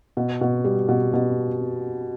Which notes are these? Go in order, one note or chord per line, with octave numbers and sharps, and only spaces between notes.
B2
B2
G3
B2
B2